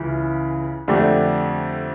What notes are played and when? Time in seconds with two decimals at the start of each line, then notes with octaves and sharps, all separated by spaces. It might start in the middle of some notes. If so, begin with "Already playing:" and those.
Already playing: C#2 C#3 E3
0.88 F2 D3 A3 D4 G4